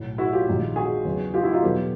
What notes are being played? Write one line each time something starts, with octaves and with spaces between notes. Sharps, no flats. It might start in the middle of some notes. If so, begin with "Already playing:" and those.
Already playing: B1 A2 F#3
E4 F#4
F4 G4
A#1 G#2 D#3
F#4 G#4
E2 C#3 F#3
F4 G4
E4 F#4
D#4 F4
E2 B2 F#3 G4 A4